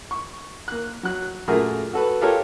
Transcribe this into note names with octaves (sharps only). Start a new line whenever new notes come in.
C#6
A#3 F#6
F#3 F#6
F#2 A#2 A3 F#4 G#4 A#4
F#4 A4 B4
F4 G4 A4 A#4 C#5